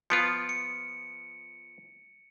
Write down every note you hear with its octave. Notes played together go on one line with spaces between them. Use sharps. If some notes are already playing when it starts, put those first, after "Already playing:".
F3 B3 F4 C#7 D7
C#7